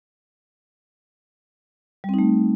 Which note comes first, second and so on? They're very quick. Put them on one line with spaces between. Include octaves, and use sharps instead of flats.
G3 C4 D#4 A3